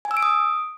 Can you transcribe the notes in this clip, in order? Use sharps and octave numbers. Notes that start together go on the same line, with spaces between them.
G#5
E6
D7
D#6